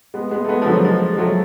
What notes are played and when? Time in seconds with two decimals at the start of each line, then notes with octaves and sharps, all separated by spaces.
0.14 G#3 B3
0.31 G#3 B3
0.45 A3
0.49 G#3 B3
0.62 F3
0.66 D3 F#3
0.84 F3 G#3
1.12 G#3
1.18 F#3 A3